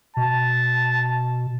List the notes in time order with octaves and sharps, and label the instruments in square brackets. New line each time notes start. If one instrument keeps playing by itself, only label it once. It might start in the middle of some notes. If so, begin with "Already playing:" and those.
[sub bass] B2 [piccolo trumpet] A5